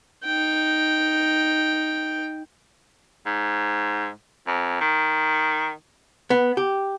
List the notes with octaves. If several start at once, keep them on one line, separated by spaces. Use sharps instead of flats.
D#4 G5
G#2
F2
D#3
B3
G4